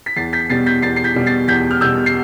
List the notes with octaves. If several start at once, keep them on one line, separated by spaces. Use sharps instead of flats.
B6
E2 A6 C7
G6 B6
B2 G3 A6 C7
G6 B6
E2 A6 C7
C7
G6 B6
B2 G3
A6 C7
E2 G6 B6
F6
B2 G3 E6 G6
C7